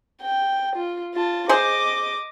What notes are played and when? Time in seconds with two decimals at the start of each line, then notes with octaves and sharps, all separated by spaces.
0.22 G5
0.76 F4
1.15 F4 A5
1.49 G#4 C5 D#5 D6